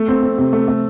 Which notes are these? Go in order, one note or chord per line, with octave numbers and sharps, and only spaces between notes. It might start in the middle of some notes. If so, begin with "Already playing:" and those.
Already playing: A3
C4
C4
C3
A3
A3